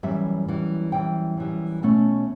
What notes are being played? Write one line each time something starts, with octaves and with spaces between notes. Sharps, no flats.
F#2 E3 G3 E5
F#2 E3 G3
F#2 E3 G3 G5
F#2 E3 G3
B2 A3 C#4 A5